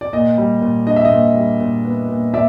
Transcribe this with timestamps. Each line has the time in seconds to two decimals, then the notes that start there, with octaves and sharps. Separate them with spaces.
0.01 D5
0.13 A#2 D#5
0.38 G3
0.61 A#2
0.86 D4 D#5
0.96 E5
1.05 D#5
1.10 A#2
1.35 G3
1.60 A#2
1.85 B3
2.08 A#2
2.33 A#2 D5 E5